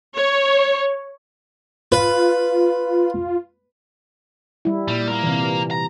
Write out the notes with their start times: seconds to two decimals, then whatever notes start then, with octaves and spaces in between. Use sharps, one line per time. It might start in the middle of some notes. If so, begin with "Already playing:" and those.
0.15 C#5
1.92 F4 B4
4.65 G3 E4
4.88 A#2 G3
5.08 A#3 A#4
5.23 C3 E3
5.71 A#5